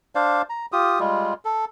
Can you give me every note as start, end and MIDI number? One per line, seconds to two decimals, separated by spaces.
0.15 0.42 62
0.15 0.42 72
0.15 0.42 74
0.15 0.42 77
0.50 0.66 82
0.72 1.00 65
0.72 1.00 67
0.72 1.00 87
1.00 1.33 55
1.00 1.33 56
1.00 1.33 65
1.45 1.65 69